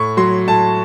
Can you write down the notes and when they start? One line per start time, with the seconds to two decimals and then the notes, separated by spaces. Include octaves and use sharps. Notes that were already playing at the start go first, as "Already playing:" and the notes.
Already playing: A2 C#6
0.17 F#3 C6
0.48 A2 A5